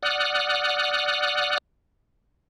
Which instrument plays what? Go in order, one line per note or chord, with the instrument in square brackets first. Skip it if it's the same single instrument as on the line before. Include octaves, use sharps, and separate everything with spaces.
[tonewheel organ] D5 F#5 D#6 F6 F#6